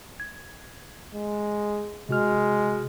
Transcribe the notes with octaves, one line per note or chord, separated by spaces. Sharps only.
G#6
G#3
C3 G#3 F#4 F6